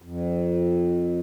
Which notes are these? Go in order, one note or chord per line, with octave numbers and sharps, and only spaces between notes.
F2